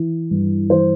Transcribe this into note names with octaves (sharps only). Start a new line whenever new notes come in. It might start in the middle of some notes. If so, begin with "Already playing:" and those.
Already playing: E3
G2
E3 C5